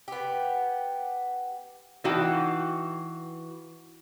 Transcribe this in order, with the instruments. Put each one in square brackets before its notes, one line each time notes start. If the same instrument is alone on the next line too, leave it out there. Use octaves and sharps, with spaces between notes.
[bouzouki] B3 G4
[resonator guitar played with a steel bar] E3 D#4 F#4 F5 G5